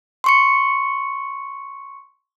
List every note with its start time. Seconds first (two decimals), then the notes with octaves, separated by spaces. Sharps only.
0.24 C6 C#6 C#7